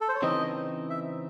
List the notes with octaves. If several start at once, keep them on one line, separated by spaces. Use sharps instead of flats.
A4
C5
C#5
C#3 E3 C4 D#4 D#5
E5